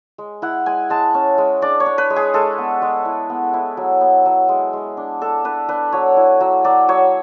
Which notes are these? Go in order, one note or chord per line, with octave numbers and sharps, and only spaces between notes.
G#3
E4 F#5
G#3 G#5
G#3 A5
C#4
G#3
D4 D5
C#5
D4
B4
G#3
G#4
G#3 A4
B3
G#3
E4
B3
E4
F#3
B3
F#3
G#3
G#3
D4
D4 A4
D4 B4
D4 B4
F#3 C#5
E4
F#3
F#3 D5
F#3 C#5